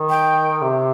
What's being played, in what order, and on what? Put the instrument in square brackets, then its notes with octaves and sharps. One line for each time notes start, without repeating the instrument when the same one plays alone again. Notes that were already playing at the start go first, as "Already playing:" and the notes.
Already playing: [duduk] D#3
[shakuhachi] G5
[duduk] C3